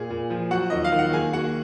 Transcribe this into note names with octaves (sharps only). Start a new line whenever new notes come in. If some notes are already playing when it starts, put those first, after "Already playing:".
Already playing: A#2 G#4
A#2
F3
F#3 F#4 F#5
D#2 D#5
F5
D#3
F#5
A#3 G#4 G#5
A#3 F#4 F#5